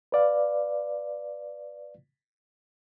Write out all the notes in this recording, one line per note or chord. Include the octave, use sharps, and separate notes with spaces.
B4 D5 F5